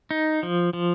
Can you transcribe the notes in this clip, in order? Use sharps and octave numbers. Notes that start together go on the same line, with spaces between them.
D#4
F3
F3